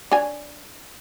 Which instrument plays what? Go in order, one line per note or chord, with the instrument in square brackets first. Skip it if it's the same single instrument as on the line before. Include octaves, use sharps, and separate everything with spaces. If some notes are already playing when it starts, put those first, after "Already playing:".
[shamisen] D4 C#5 G#5